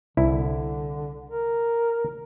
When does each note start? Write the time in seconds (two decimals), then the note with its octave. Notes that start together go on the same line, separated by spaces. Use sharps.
0.17 C2 D3 E4
1.30 A#4